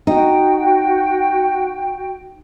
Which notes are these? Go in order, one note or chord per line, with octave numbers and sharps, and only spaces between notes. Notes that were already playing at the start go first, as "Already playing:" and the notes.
D#4 F#4 G5